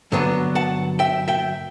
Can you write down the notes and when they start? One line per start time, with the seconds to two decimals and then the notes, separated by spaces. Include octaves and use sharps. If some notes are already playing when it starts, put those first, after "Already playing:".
0.12 G2 D3 F#3 B3 D4
0.55 F#5 A5
0.99 E5 G5
1.28 E5 G5